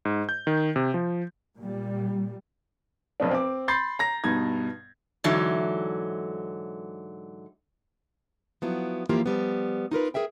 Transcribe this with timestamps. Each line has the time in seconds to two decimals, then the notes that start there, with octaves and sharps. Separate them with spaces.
0.05 G#2
0.29 G6
0.47 D#3
0.76 C3
0.94 F3
1.58 A#2 G3
3.20 F1 B1 F2 D4
3.31 C4 D6
3.68 B5 C6 G6 A6 C7
3.99 A#5 A#6
4.24 G2 B2 D#4 G#6
5.24 G#2 D3 E3 F#3
8.62 F3 F#3 B3 E4
9.09 E3 F3 A#3 E4 F4 G4
9.26 F3 G3 B3
9.91 D#4 F4 A#4 B4
10.14 G#4 A#4 E5 G5